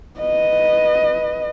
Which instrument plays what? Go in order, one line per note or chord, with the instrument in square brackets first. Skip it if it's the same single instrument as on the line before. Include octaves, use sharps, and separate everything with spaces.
[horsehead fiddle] B4 D#5